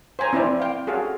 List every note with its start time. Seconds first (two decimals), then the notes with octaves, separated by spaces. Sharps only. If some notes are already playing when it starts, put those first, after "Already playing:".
0.19 C5 G5 G#5 A#5
0.33 C4 E4 C5 D5
0.60 F5 G5
0.87 F#4 G#4 A4 F5